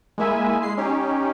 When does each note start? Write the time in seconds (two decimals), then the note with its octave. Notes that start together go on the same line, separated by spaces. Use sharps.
0.18 G#3 A#3 E4 E5 G#5
0.62 G#3 C7
0.77 C#4 D#4 G4